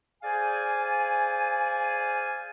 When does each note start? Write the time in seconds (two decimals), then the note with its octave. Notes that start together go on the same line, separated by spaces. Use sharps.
0.23 G#4 C5 D5 F5 G#5